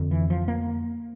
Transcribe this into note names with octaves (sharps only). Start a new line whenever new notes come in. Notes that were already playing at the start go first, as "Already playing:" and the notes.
Already playing: F2 D3
E3
F3
A#3